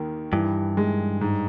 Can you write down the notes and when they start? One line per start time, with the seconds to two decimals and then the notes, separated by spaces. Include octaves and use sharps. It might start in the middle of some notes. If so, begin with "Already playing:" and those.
Already playing: D#2 D#3
0.32 G2 E3
0.77 G#3
1.21 G#2